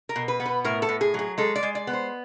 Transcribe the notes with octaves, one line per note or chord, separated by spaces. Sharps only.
A#4
B2
B4
B3
B4
A2 A#4
A4
A2
G#4
F#3 G#4
G#3 A4
D5
G#3
D5
B3
C5